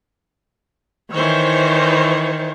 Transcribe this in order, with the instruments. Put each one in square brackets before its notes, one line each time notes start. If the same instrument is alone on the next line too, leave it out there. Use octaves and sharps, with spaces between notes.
[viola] D#3 [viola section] E3 C5 C#5